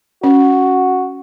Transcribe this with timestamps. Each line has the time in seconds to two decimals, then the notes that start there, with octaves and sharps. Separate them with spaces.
0.23 C#4 F#4